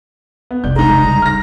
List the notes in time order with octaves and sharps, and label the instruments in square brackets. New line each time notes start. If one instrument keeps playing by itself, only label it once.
[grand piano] B3
[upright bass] F1 B1 [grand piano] D5 G6
[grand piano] G#3 D#4 [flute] A#5
[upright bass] F1
C#3 G3
[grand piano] F6 A#6